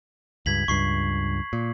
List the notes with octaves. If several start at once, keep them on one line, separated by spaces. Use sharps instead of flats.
C#2 G2 G#6 B6 F#7
C#2 G2 C#6 C7
A#2